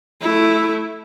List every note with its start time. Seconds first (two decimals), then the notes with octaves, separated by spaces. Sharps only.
0.21 A3 E4